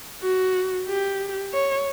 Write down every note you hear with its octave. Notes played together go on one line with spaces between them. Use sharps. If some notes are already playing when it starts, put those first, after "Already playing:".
F#4
G4
C#5